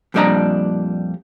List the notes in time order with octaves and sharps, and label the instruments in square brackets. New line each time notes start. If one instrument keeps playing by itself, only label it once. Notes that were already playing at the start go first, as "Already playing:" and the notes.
[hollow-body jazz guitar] F2 A#2 G3 D4 D#5 A#5